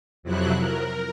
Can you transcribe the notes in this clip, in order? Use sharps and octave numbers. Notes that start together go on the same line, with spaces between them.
F2 C3 F3 F#3 E4 F#6
A#4